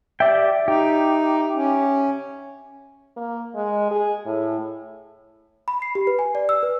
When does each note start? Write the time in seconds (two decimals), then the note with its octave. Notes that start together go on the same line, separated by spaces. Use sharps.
0.20 G4 D5 E5 G5
0.68 D#4 G4
1.55 C#4
3.17 A#3
3.55 G#3
3.91 G#4
4.26 A2
5.68 B5
5.82 C7
5.95 G4
6.07 B4
6.19 G#5
6.35 D5
6.49 E6
6.63 B4